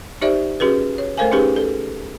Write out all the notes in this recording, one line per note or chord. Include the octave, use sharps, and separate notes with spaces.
D#4 G4 C5 D5 E5
C#4 F#4 G#4 B4
C#5
A3 A4 A#4 C5 F5 G#5
C#4 D#4 G4 G#4 B4
A4